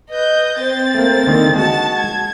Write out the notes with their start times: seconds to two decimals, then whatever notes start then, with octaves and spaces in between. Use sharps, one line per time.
0.10 B4 D#5 G6
0.58 C4 C5 A6
0.94 A3 A#3
1.27 D3 D#3 A#3
1.55 G#3 F#4 F#5 A5 A6
1.97 G#6